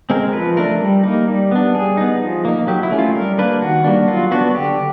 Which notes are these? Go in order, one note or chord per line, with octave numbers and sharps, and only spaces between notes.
G#3 C4 A#4
F3 B4
A3 D4 A#4
G3
A#3 D#4
G3
B3 D4
G3 G#4
B3 D#4
F3
A#3 D#4
F#3 G4
E4
A3 C#4
F4
G3 A#4
A#3 D4 B4
D#3 F#4
G3 A#3 D4
F#3 F4
B3 D4 F#4
D3 G4